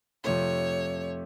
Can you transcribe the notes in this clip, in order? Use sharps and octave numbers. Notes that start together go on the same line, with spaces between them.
F2 C3 F3 A3 C#5